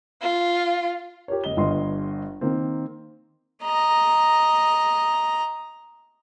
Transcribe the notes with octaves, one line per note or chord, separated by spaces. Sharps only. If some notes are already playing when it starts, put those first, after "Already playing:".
F4
G4 A#4 C#5
F#1 D#5 G7
G1 G2 D#5 C6
D#3 A#3 C4
D#5 A#5